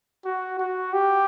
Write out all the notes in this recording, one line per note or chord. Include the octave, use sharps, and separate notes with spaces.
F#4
F#4
G4